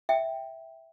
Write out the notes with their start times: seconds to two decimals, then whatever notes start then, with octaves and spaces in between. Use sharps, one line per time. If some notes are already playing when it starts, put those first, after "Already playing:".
0.09 E5 G5